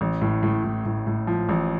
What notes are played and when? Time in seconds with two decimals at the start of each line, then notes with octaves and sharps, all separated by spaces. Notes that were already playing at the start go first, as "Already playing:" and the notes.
0.01 A1
0.22 A2
0.43 A2
0.64 A2
0.85 A2
1.07 A2
1.27 F3
1.49 A1